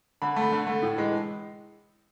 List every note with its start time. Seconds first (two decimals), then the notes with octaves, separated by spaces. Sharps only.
0.22 D3 B5
0.36 A3
0.42 B5
0.52 D3
0.67 A3
0.82 A2
0.98 E3 G#3